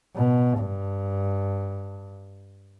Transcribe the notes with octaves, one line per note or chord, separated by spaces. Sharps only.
B2
G2